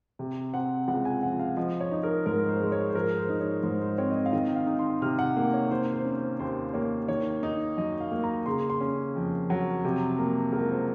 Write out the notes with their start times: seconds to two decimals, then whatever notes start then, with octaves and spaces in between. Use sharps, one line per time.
0.19 C3
0.54 C4 F#5
0.88 C#2 F#5
1.05 G#5
1.23 F3 F#5
1.39 F5
1.57 F3 D#5
1.80 C#5
1.91 D#4
2.03 A#4
2.26 G#2 A#4
2.49 C5
2.60 G#3
2.72 C#5
2.90 C5
2.95 F3 A#4
3.19 C5
3.29 D#4
3.41 C#5
3.63 G#2 C5
3.82 C5
3.98 C4 C#5
4.11 D#5
4.16 C#5
4.26 F5
4.33 D#3 D#5
4.56 F5
4.67 D#4
4.79 C6
5.02 C3 F6
5.19 F#5
5.36 A#3 F5
5.54 C#5
5.70 D#3 C5
5.94 C5
6.05 C#4
6.17 C5
6.40 D#2 C5
6.74 A#3 C#5
7.08 D#3 C#5
7.43 D#4
7.77 F#2 D#5
8.00 F5
8.12 A#3
8.24 A#5
8.46 C#3 C6
8.70 C6
8.81 C#4
9.15 F2
9.50 F#3
9.84 C3
10.19 A#3
10.53 C#2 A#4
10.70 C5